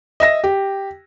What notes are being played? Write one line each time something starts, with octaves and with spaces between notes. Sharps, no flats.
D#5 E5 A#6
G4